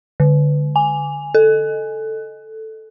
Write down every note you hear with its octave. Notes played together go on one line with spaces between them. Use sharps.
D3
G#5
A4